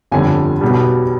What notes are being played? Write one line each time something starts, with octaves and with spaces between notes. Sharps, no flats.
G1 F2 D3 G3 G#5
B1 B2 G3